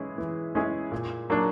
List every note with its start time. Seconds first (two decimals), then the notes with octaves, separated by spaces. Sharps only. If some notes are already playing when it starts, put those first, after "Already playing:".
Already playing: E3 G#3 C#4 E4 G#4
0.18 E3
0.55 G#3 C#4 E4 G#4
0.92 A#2
1.30 F#3 A#3 D4